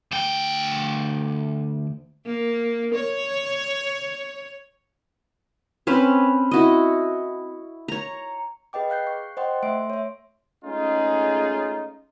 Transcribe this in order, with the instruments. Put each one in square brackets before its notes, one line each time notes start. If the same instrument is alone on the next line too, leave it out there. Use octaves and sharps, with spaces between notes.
[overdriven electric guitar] D2 G5
[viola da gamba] A#3
C#5
[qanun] C4 C#4 B4
E4 F#4 D#5
C#5 A#5
[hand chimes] G#4 B4 D#5 G5 D6
F5 F#6 G6 C7
C#6
C5 D#5 F#5 G5 C6
A3 E5 C6 D7
C#5 E5
[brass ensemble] G#3 A3 C#4 D#4 F4 G#4